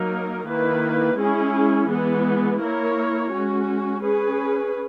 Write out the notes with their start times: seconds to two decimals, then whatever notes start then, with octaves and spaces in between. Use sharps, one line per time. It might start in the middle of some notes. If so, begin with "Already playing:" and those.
Already playing: F#3 A#3 D#4 A#4
0.46 D#3 A#3 E4 B4
1.17 G#3 C#4 E4 G#4
1.89 E3 G#3 B3
2.60 A#3 E4 A#4 C#5
3.32 G#3 C#4 F#4
4.02 C#4 G#4 B4